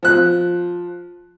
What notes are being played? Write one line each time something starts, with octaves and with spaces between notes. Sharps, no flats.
F3 F#6